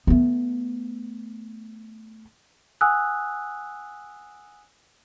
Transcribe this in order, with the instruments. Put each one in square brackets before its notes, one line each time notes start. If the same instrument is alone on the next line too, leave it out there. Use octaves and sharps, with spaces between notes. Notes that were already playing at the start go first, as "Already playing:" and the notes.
[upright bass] A3 B3
[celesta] F#5 G#5 D#6 E6 F#6